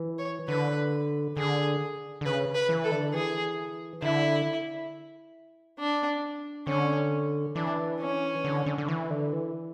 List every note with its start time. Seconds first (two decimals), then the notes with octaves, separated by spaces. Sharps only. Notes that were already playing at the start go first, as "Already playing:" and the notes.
Already playing: E3
0.18 C#5
0.48 D3 B4
1.37 D3 G#4
2.21 D3
2.25 C#3 B4
2.55 B4
2.69 E3
2.84 A4
2.92 D3
3.13 E3 G#4
4.02 D3 E4
5.79 D4
6.67 D3 C#4
7.55 E3 D4
8.00 C#4
8.45 D3
8.66 D3
8.78 D3
8.88 E3
9.10 D3
9.33 E3